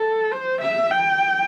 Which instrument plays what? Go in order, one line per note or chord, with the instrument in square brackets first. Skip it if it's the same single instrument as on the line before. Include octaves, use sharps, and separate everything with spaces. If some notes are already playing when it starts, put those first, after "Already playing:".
Already playing: [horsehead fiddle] A4
C5
E5
G5